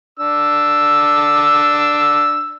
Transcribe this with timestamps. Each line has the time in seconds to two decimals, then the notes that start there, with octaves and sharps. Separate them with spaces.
0.19 D4 E6